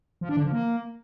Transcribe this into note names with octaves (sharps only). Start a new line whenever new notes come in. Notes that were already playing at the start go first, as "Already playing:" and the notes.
F3
D4
D3
F3
A#3